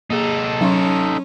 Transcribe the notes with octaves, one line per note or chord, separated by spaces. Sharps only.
A#3 D#4 G#4 A4
F#3 C#4 C6 C#6